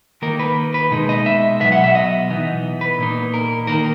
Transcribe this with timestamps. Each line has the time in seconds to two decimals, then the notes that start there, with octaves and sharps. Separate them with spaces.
0.22 D#3 A#3 D#4 A#4
0.39 B4
0.74 B4
0.91 B2 G#3 D#4
1.09 D#5
1.26 E5
1.60 B2 F#3 B3 E5
1.72 F#5
1.84 E5
1.95 D#5
2.30 E3 B3 D#4
2.81 B4
2.99 A#2 A#3 D#4
3.34 A#4
3.67 D#3 A#3 D#4 A#4